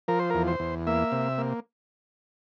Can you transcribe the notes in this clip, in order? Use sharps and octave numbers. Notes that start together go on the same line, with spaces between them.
F3 A#4
C5
E2 A#4
C5
E2
A#3 E5
C3
A#3